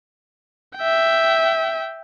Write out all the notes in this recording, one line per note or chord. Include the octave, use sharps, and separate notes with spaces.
E5 G5